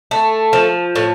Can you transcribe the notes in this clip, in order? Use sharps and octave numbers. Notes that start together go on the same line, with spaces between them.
A3
F3
A2